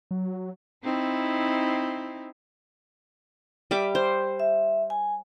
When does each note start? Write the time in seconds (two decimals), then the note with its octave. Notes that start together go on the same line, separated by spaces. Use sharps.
0.11 F#3
0.84 C4 D#4 E4
3.71 G3 E5 D6
3.95 C5
4.40 E5
4.90 G#5